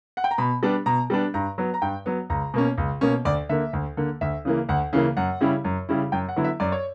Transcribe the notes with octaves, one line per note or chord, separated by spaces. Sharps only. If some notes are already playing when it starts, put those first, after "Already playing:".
F#5
G5
A#5
B2 B5
G3 B3 D4
B2 A#5
G3 B3 D4
G2 A#5
F#3 B3
A#5
G2 G5
F#3 B3
C#2 A#5
B2 A#3 C#4
C#2
B2 A#3 C#4
D2 D5
D3 A#3 E5
D2
D3 A#3
D2 E5
C#3 E3 A#3
D2 F#5
C#3 E3 A#3
F#2 F#5
C#3 G3 C#4 E4
F#2
C#3 G3 C#4 E4
F#2 G5
F#5
D3 F#3 B3 E4
E5
F#2 D5
C#5